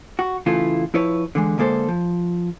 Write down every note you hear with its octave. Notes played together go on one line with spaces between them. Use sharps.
F#4
C#3 E3 A3 E4 F4
F3 E4 B4 C#5
D3 E3 G#3
D3 G#3 A#3 A4 C5
F3